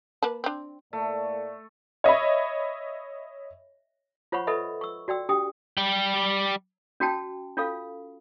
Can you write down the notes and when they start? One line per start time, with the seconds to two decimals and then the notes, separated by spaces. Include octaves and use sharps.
0.23 A#3 B4 A5
0.44 C4 D4
0.93 A2 A3 A#3 D5
2.04 C#5 D#5 E5 B5
4.32 F4 C5 C#5 F#5 B5 C#6
4.47 A4 B4 D#5 E5 B5
4.81 C#6 E6
5.08 F#4 D5 G5 E6
5.29 D4 G4 G5 D#6
5.77 G3 G5
7.00 C#4 F#4 G5 A5
7.57 C#4 F4 A4 F5